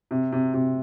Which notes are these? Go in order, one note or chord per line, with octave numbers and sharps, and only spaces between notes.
C3
C3
C3